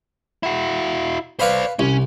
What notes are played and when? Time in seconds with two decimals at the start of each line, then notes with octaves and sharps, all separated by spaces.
0.43 E4 F#4
1.40 B4 C5 D5 F5 B5
1.79 C2 C#4